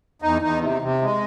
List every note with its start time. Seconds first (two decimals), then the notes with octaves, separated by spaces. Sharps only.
0.22 E2 D#4
0.42 E2 D#4
0.61 C3
0.82 C3
1.02 G#3